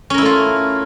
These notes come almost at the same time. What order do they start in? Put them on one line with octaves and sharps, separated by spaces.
C#4 A#4 E4 A3 F4